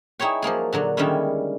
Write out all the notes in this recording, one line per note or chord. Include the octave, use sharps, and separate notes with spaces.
D#4 E4 G#4 C#5 G5
F3 F#3 A#3 G#4
A#2 D3 F#3
D3 D#3 G3 G#3 C#4 E4